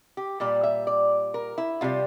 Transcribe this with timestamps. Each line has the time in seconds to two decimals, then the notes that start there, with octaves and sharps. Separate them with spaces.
0.17 G4
0.40 A#2 G3 D5
0.63 E5
0.87 D5
1.34 A#4
1.58 E4
1.81 C3 G3 F4